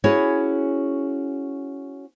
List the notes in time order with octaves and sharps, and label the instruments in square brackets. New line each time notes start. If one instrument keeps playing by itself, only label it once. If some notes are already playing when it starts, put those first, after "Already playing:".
[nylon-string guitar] C#4 E4 F#4 G#4 C#5